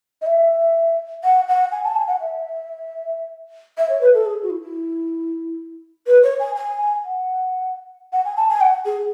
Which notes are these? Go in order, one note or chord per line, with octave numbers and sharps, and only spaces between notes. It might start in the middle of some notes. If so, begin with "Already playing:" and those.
D#5
E5
F#5
F#5
G#5
A5
G#5
F#5
E5
E5
C#5
B4
A4
G#4
F#4
E4
E4
B4
C#5
G#5
G#5
F#5
F#5
G#5
A5
G#5
F#5
G#4